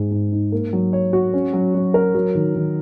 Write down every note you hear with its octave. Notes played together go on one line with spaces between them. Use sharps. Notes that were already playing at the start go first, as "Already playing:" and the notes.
Already playing: G#2 G#3
G#2
D#4
A#3
F#3
C#5
F#4
C#4
F#3
F#3
A#4
F#3
D#3
D#3